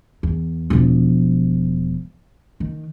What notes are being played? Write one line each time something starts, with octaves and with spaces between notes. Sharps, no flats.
E2
E1 F3
D#3